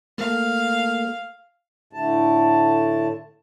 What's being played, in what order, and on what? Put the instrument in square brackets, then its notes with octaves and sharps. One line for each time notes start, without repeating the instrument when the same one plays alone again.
[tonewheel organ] A3 A#3 [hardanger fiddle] F5
[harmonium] A2 D3 A3 A5